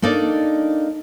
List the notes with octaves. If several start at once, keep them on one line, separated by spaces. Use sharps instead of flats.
A#3 D4 D#4 A4 D5